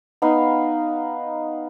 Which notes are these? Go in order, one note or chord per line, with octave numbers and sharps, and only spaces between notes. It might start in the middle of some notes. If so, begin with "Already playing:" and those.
B3 D#4 F5